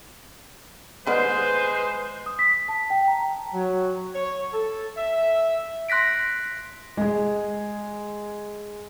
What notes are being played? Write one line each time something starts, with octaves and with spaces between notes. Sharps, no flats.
D3 D#3 G#3 B3 B4 C5
D#6
B6
A5
G5
A#5
F#3
C#5
A4
E5
C6 F#6 A#6 B6 D7
G#3 G#4